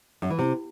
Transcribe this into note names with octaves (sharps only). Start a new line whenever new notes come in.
F#2
E3
C3